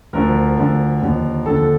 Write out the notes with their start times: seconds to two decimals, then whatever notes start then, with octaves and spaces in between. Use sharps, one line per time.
0.13 D2 D3 F3 A#4
0.57 D2 D3 F3
1.02 D#2 D3 F3
1.46 D#2 D3 F3 A4